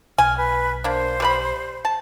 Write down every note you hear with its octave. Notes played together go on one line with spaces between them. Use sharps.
B1 G#5 F6
B4
A#3 D4 C5
G3 B4 B5
A5